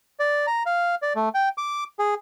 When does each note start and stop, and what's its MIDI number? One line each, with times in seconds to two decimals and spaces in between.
0.20 0.46 74
0.47 0.63 82
0.66 0.95 77
1.02 1.13 74
1.16 1.29 57
1.34 1.49 79
1.58 1.84 86
1.99 2.14 68